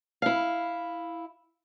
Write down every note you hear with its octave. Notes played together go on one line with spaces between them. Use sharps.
E4 F5